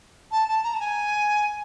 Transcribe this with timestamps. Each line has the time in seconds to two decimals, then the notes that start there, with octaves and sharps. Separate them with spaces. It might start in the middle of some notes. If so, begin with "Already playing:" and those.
0.31 A5
0.48 A5
0.63 A#5
0.74 A5
0.80 G#5